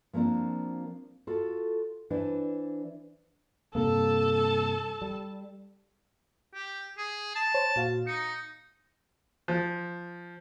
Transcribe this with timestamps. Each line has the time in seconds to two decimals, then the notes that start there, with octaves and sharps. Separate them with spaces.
0.13 F3 A#3 C4 D4 F4
1.27 F4 F#4 A4
2.10 E3 D4 E4 B4 C5
3.75 G2 C3 A#3 A4 A5
5.02 G3
6.54 G4
6.97 G#4
7.35 A5
7.54 C5 C#5
7.76 A#2 F#4 F5
8.07 D#4 C#7
9.48 F3